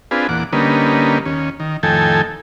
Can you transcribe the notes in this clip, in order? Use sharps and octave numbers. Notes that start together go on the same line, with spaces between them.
C4 D4 F4 G#4 B4
E2 A#2 F#5 D6
D3 G3 A#3 C#4 D#4 B4
D#2 C#4
D#3
F2 A2 D#3 A4 G5 G#5